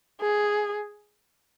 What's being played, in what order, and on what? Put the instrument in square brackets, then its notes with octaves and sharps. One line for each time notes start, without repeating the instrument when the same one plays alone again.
[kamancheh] G#4